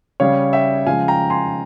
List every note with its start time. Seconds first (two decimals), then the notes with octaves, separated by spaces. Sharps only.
0.20 C#3 G3 C#5 F5
0.53 E5 G5
0.86 C#3 F3 G#3 F5 G#5
1.08 G5 A#5
1.30 G#5 C6